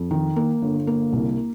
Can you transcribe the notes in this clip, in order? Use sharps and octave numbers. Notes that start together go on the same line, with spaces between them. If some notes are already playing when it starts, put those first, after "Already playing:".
Already playing: F2
D#3
A#3
G1
A#3
C2